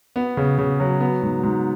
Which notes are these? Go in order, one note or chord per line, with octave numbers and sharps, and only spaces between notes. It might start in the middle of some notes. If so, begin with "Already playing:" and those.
B3
C#3
C#3
F#3
B3
G#2
G#2